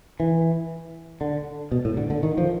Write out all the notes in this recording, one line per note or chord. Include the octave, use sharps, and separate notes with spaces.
E3
D3
B2
A2
D3
D3
D#3
F3